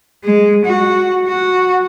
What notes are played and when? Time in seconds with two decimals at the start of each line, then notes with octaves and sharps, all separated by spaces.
0.24 G#3
0.65 F#4
1.27 F#4